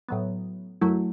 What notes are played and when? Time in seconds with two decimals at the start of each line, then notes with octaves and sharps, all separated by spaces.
0.09 A2 F#3 B3
0.81 F#2 F#3 A3 E4